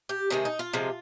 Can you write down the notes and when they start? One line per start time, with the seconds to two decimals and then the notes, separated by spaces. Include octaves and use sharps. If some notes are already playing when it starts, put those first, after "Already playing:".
0.09 G4
0.30 C3 D#3 G#3 G#4
0.45 D#4
0.59 F4
0.73 C3 F3 G#3